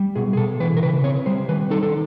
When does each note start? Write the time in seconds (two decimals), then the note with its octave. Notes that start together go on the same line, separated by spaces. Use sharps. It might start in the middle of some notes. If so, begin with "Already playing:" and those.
Already playing: G3
0.16 B2 G#4
0.33 G#4
0.37 B2 A4
0.60 E3 B4
0.77 A#4
0.82 C#3 B4
1.04 C4 C#5
1.26 G3 C5
1.48 D#3 B4
1.70 D#4 A4
1.83 A4